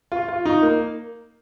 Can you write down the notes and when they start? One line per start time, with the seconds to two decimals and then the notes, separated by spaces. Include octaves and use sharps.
0.12 F4
0.28 F4
0.45 D#4
0.62 A#3